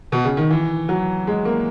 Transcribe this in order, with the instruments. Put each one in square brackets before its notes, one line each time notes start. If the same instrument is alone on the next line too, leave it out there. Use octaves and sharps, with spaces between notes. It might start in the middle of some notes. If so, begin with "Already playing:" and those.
[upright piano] B2
C#3
D#3
E3
F#3
G#3
A#3